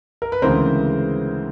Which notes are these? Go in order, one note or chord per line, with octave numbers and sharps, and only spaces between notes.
A#4
B4
D2 C#3 E3 G#3 C4 A#4 C5